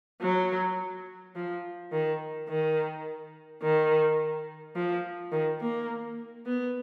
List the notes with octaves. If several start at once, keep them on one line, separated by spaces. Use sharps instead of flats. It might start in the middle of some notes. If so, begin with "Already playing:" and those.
F#3
F3
D#3
D#3
D#3
F3
D#3
A#3
B3